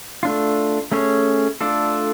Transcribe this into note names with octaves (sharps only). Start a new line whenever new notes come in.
A3 D4 F4
A3 C#4 G#4 C#5
A3 D4 F4 A4 D5